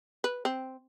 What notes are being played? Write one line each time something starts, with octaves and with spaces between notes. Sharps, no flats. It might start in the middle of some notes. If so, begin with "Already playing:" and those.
B4
C4